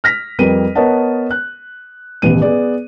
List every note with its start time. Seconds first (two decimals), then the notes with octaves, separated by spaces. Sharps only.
0.04 F6 A#6 B6
0.39 F2 G3 A#4 B4 D#7
0.75 B3 A#4 C#5 D#5 F#5 A5
1.31 F#6
2.22 D#1 A1 B2 D#7
2.42 B3 G#4 D5